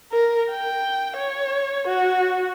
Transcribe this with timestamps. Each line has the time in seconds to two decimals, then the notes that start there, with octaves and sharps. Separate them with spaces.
0.12 A#4
0.51 G5
1.17 C#5
1.87 F#4